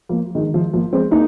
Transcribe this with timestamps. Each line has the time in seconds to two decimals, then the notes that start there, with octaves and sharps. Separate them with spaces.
0.09 F3 A#3
0.35 D#3 G#3
0.54 F3
0.73 F3 A#3
0.93 G#3 C4
1.11 A#3 D#4